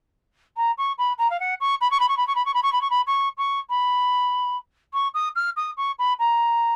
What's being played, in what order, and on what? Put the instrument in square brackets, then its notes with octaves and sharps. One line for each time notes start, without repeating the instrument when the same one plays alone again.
[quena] A#5
C#6
B5
A#5
F5
F#5
C#6
B5
C#6
B5
C#6
B5
C#6
B5
C#6
B5
C#6
B5
C#6
B5
C#6
C#6
B5
C#6
D#6
F6
D#6
C#6
B5
A#5